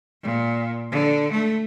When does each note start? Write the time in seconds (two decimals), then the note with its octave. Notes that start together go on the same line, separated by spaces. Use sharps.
0.23 A#2
0.91 D3
1.32 A3